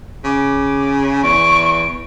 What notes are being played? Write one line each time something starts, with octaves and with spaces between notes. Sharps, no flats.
C#3 D6
E2 C#6 D7